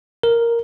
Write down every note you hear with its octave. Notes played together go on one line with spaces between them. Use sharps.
A#4